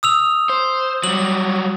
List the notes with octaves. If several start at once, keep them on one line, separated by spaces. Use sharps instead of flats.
D#6 E6 F7
C5
F#3 G3 F#7